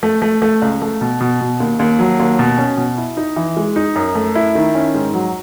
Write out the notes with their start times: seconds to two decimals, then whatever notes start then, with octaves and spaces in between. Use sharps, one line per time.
0.03 A3
0.22 A3
0.42 A3
0.62 C#2
0.82 A3
1.01 B2
1.21 B2
1.41 B2
1.60 D#2
1.79 D#2
1.99 F#3
2.19 D#2
2.39 B2
2.58 C#4
2.77 B2
2.97 E4
3.17 D#4
3.36 E3
3.57 G#3
3.76 D#4
3.95 F#2
4.15 A3
4.35 E4
4.55 D#3
4.75 C#4
4.94 G#2
5.14 F#3